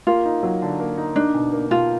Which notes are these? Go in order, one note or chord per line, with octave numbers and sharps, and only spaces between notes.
A#3 F4
D#4
F#3
D3
A#3
D#4
D4 D#4
B2
A#3
B2 F4